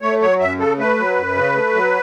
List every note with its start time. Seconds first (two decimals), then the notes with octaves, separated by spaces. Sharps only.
0.01 A3 C#5
0.21 F#3 C#5
0.40 F#2 E5
0.59 C#3 A4
0.78 A3 B4
0.98 F#3
1.16 F#2
1.36 C#3
1.55 A3
1.75 F#3